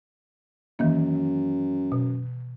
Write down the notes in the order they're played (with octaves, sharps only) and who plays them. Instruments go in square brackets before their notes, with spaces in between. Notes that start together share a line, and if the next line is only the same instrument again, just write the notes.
[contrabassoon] F#2 [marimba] D#3 E3 A#3
[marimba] B2